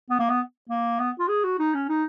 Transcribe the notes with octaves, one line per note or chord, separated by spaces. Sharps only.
B3
A#3
B3
A#3
B3
F4
G#4
F#4
D#4
C#4
D#4